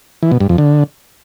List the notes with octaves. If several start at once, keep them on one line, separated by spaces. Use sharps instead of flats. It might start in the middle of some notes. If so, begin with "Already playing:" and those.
E3
B2
G2
F2
D3